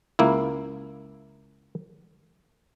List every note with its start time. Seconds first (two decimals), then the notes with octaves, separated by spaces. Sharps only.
0.19 C#2 A#3 E4